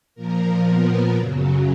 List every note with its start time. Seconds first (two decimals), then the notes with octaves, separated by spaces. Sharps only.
0.15 A#2 F3 A#4
0.65 B3
1.16 F#2 C#3 F#3